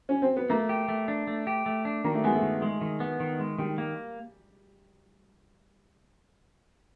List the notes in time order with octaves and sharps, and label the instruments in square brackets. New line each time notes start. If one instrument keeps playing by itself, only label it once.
[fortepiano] C#4
C4
B3
[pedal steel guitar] A3 [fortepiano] A#3
[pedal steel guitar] G4
A3
D4
A3
G4
A3
D4
[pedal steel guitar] D#3 [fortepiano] A#3
[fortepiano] A3
[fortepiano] G#3 [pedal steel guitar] B3
[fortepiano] A3
[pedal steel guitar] D#3
G#3
D#3
B3
D#3
G#3
[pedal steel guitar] D#3 [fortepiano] G3
[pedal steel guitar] A#3